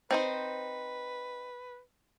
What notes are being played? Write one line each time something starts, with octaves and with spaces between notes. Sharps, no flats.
C4 D#4 B4 C5